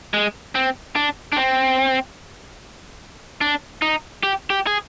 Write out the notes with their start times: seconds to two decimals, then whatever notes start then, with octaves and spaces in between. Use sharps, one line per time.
0.14 G#3
0.55 C4
0.96 D4
1.32 D4
1.37 C4
3.41 D4
3.82 D#4
4.23 G4
4.50 G4
4.67 G#4